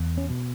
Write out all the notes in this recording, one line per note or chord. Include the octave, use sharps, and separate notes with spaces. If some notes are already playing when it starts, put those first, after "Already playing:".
Already playing: E2
C#4
B2